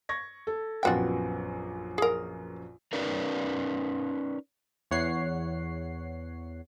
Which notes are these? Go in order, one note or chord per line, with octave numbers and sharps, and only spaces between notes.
C#6 G#6 A#6
A4
A#1 F#2 B3 F4 F#4 G5
G#4 A#4
C#4 D#4 A#4 B4 D5
E2 C#5 F#5 C7